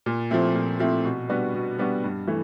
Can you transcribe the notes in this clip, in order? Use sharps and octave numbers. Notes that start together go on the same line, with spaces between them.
A#2
F3 A3 C4 E4
A#2
F3 A3 C4 E4
B2
G3 B3 D4 F#4
B2
G3 B3 D4 F#4
G2
E3 A3